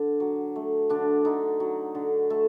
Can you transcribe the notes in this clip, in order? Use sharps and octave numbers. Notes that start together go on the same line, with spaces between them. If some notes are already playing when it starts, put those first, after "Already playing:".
Already playing: D3 D4
F#3
A3
D3 D4
D3 D#4
F#3
D3
A3 A4